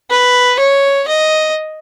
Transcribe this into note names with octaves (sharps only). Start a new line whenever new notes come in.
B4
C#5
D#5